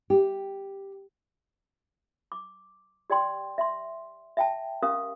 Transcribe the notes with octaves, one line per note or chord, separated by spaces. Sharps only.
G4
D6
G4 D5 G5 C6
E5 C6
E5 G5 A5
C#4 G4 A#4 F5 D#6